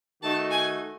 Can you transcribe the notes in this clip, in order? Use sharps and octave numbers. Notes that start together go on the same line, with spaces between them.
D#3 A3 D#4 F#4 A5
G#5